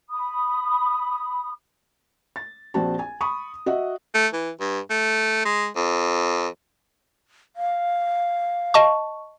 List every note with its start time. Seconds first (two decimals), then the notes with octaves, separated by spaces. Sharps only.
0.10 B5 D#6
2.36 A6
2.74 A#1 C4 F#4 A5
2.99 G#5
3.21 B5 C#6 D#6
3.66 F#4 D#5 E5 F#5
4.15 A3
4.33 E3
4.60 G2
4.90 A3
5.45 G#3
5.76 F2
7.56 F5
8.74 D#5 A5 C#6